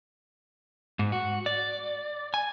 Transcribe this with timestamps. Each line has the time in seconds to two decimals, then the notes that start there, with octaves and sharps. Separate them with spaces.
0.99 G#2
1.12 F#4
1.46 D5
2.34 G#5